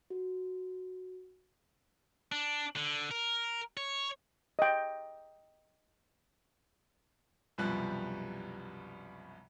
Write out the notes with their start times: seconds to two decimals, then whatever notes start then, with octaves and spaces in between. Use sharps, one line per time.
0.10 F#4
2.32 D4
2.76 D3
3.11 A#4
3.77 C#5
4.59 D#5 G5
7.58 C2 F#2 B2 F3 G3 F#6